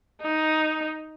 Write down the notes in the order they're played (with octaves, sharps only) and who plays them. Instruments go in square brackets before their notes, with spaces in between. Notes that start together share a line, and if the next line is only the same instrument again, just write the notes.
[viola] D#4